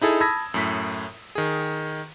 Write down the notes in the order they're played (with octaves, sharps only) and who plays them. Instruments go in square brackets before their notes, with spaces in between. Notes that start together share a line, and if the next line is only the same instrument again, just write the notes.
[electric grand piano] D#4 E4 G#4 A4
A5 B5 D#6 E6 G#6 A#6
F#2 A2 B6
D#3 G#4